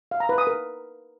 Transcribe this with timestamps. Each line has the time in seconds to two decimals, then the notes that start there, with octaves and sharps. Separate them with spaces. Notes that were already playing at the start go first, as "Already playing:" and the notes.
0.11 F5
0.20 A#5
0.29 B4
0.38 D#6
0.47 A#4